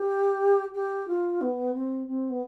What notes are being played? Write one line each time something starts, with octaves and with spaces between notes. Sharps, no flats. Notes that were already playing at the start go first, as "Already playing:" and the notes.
Already playing: G4
G4
F4
B3
C4
C4
B3